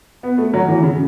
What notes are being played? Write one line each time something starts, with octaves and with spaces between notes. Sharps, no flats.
B3
A3
F#3
E3
C#3